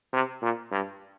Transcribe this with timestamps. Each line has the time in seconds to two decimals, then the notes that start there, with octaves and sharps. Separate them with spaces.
0.13 C3
0.42 A#2
0.71 G2